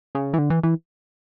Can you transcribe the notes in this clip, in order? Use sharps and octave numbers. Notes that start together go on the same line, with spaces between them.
C#3
E3
D3
E3
E3